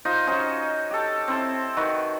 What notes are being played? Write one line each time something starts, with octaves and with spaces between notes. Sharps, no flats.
D#4 F4 C5 D#5
C#4 D#4 F#4 C5
G4 A4
C4 E4 A4
D#3 F#4 B4